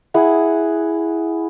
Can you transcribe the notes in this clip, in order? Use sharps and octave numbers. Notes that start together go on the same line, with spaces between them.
E4 G#4 F#5